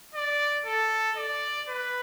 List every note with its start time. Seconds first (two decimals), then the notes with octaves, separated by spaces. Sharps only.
0.14 D5
0.66 A4
1.17 D5
1.68 B4